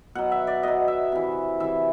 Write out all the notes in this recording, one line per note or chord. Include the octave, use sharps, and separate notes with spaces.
B2 F#3 F#5
E5
D5
B2 F#3 D#5
E5
C3 E3
C3 E3 E5